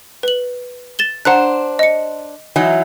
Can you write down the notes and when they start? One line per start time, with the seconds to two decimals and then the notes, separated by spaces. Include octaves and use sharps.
0.23 B4 F#7
0.99 A6 E7 G7
1.25 D4 C5 F#5 A#5 F#6
1.79 D#5 C#7
2.56 E3 F#3 D#4